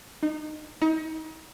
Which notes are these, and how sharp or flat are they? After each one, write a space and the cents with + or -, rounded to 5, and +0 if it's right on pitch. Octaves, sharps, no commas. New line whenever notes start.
D#4 -25
D#4 +35